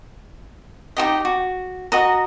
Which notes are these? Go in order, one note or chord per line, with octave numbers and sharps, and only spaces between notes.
D#4 F#4 G4 D#5
F#4
F#4 D#5 A#5